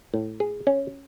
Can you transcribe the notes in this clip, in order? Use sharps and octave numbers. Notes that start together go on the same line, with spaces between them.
A2
G#4
C#4